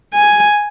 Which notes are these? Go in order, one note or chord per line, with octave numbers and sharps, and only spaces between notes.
G#5